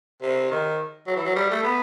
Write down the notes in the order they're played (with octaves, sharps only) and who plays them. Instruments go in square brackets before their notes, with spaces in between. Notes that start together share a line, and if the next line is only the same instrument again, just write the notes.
[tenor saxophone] C3
D#3
F#3
E3
F#3
G3
A3
B3